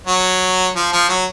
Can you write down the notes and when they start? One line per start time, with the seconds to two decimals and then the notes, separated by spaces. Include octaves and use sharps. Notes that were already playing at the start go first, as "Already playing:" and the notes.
0.07 F#3
0.75 F3
0.92 F3
1.09 F#3